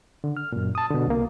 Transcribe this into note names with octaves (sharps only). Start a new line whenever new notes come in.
D3
F6
F#2 A#2
A5 D#6
B2 D3
C2 A#3